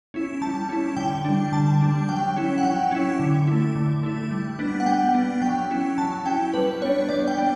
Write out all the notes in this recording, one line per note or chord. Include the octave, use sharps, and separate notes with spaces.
C#4 E4
G3 A5
C#4 E4
D3 G5
G3 D4
D3 A5
G3 D4
F#3 G5
C#4 E4
F#5
F#3 G5
C#4 E4
D3
A3 E4
D3
A3 E4
G3
B3 D4
F#5
G3 G5
B3 D4
F#3 G5
C#4 E4
F#3 A5
C#4 E4 G5
G3 B4
B3 D4 C#5
G3 D5
G5
B3 D4